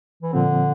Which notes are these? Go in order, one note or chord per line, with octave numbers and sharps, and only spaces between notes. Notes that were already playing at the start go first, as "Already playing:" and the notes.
E3
A#2 D3 F3 C4